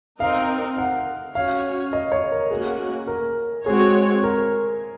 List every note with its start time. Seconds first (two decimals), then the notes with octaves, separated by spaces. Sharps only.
0.20 C4 D#4 A#4 F5
0.78 F#5
1.35 C#4 F#4 C#5 F5
1.93 D#5
2.12 C#5
2.32 A#4
2.51 A#3 C#4 F#4 G#4
3.07 A#4
3.65 G#3 C4 F#4 G#4 C#5
4.23 A#4